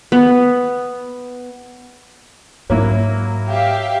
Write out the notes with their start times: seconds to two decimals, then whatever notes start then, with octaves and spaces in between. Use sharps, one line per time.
0.12 B3
2.70 G#2 F#3 A#3 E4
3.48 G4 E5 F5